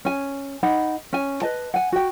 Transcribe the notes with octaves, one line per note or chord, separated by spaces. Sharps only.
C#4 G#5
D#4 F#5 B5
C#4 G#5
B4 D#5 A5
F#5 G#5
F#4 G5